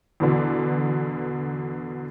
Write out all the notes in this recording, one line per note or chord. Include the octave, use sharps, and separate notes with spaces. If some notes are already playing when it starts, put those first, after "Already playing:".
E2 B2 D3